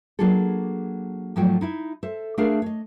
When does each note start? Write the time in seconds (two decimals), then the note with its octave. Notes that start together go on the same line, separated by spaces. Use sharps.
0.19 F#3 A#3 D4 F4 G#4 A4
1.36 G#2 F3 F#3 A3 C#5 G5
1.61 D#4 E4 E5
2.03 A4 C5 E5
2.38 A3 D4 G#4 A#4 E5 F5
2.62 C#5 D#5